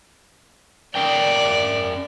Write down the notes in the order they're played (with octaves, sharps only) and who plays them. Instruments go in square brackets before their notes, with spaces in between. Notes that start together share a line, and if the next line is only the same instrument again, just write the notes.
[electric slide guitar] C#4 A#4 G5 [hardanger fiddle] D5